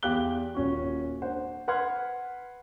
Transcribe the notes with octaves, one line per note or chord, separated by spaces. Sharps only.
E2 G4 F5 F#6 G7
D#1 C#4 F#4
D4 C5 F#5
B4 F#5 C6 F6 G#6